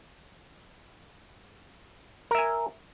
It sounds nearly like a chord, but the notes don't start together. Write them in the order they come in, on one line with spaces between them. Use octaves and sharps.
A#4 E5 G#5